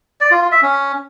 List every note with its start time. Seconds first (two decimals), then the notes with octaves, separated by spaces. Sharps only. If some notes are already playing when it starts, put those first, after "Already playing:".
0.21 D5
0.31 F4
0.42 F4
0.52 E5
0.62 C#4